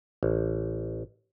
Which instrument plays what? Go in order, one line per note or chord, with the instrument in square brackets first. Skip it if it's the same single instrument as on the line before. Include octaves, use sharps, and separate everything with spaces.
[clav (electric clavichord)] A1